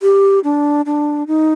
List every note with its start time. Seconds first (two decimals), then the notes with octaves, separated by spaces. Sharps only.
0.02 G4
0.44 D4
0.86 D4
1.27 D#4